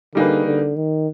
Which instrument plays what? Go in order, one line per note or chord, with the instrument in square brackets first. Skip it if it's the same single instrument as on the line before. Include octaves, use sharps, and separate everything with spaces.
[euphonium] D3 [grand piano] G3 A#3 D#4 G#4 B4
[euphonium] D3
D#3